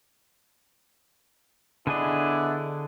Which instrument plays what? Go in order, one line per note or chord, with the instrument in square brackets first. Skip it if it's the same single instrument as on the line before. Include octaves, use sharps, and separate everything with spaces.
[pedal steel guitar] D3 G#4 D#5 [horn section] B3 D4 E4